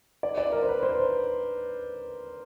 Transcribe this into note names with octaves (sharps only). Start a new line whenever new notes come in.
D5
D5
A#4
C5
B4
C5